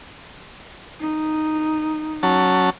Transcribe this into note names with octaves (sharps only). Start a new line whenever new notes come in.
D#4
F#3 C#4 A5